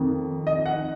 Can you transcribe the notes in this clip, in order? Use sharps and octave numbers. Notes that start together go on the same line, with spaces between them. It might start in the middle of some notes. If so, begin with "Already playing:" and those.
Already playing: F2 D#3
D#5
F#5